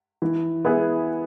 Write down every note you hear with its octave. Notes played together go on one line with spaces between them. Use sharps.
E3
B3 E4 G#4